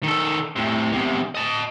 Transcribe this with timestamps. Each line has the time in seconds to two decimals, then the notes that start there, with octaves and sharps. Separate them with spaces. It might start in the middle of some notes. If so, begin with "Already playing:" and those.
0.04 D#3 A4
0.56 A2 C3
0.92 E2 C3
1.35 D#5 A5